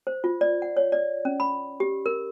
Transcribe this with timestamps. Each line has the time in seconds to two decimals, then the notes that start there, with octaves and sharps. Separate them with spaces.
0.07 C5
0.24 F4
0.41 D5
0.62 F#5
0.77 C#5
0.92 D5
1.25 C#4
1.40 B5
1.80 G4
2.06 A#4